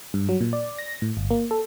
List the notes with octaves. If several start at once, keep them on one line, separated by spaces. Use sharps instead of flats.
G2
F#3
A#2
D5
A#6
A2
G1
A#3
A4